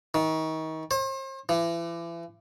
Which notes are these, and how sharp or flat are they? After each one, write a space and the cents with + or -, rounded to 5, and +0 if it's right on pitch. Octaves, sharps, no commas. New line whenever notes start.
D#3 +30
C5 +40
E3 +35